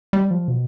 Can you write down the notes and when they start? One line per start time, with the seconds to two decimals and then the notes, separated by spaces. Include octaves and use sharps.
0.13 G3
0.31 F3
0.48 B2